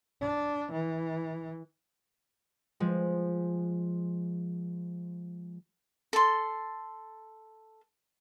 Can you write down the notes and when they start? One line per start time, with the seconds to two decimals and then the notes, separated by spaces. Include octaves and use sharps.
0.21 D4
0.72 E3
2.80 F3 G#3
6.13 A4 C6